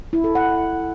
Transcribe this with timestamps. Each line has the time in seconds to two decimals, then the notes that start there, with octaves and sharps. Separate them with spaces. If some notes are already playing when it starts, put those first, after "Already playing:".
0.13 E4
0.24 A4
0.35 F#5